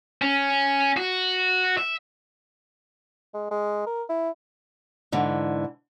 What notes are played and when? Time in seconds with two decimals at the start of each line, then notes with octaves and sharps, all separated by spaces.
0.22 C#4
0.97 F#4
1.78 E5
3.34 G#3
3.51 G#3
3.87 A#4
4.09 E4
5.12 G#2 D3 E3